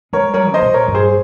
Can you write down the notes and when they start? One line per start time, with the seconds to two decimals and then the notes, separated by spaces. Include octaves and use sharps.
0.13 G#3 A#4 C#5
0.34 G3 A#4 C#5
0.50 C3 C5 D#5
0.61 A#2
0.74 A#4 C#5
0.88 G2
0.94 G#4 C5